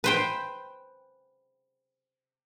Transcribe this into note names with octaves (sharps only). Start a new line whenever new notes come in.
B4 C5 G5